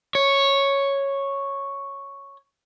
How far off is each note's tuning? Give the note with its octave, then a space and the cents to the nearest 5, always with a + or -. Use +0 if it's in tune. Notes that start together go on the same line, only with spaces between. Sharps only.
C#5 -5